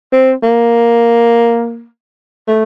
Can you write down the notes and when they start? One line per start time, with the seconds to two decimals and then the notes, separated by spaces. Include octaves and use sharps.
0.13 C4
0.43 A#3
2.48 A3